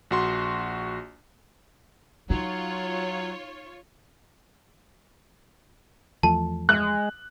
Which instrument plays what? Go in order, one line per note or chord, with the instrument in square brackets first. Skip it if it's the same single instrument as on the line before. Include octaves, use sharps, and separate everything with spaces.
[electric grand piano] A#1 F#4 C6
[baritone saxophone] F#3 [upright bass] D#4 [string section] F4 C#5
[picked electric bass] E2 F3 A3 [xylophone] A5
[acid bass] G#3 [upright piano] F#6